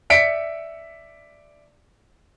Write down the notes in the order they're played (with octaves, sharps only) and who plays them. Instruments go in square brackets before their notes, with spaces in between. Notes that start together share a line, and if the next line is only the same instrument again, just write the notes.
[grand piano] D5 E5 B6 C#7 D7